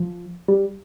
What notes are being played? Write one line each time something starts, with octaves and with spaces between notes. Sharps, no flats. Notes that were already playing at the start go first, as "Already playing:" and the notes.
Already playing: F3
G3